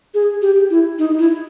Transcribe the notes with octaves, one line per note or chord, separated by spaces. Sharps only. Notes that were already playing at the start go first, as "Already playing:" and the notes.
G#4
G4
E4
D#4
E4